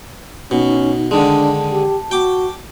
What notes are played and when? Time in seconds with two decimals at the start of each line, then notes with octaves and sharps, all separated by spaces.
0.51 B2 C#4 D#4
1.11 D3 D#3 G#3 D4 A5
1.72 G4
2.11 F#4 G5 D6